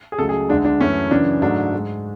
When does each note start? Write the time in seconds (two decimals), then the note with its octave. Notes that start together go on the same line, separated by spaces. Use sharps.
0.12 G#4
0.19 C#2 C#3 F#3 A3 A4
0.29 G#4
0.49 D2 D3 G#3 D4
0.65 D4
0.80 F#2 E3 A3 C#4
1.11 F#2 C#3 E3 D4
1.42 G#2 F#3 A3 D4
1.73 G#2 G#3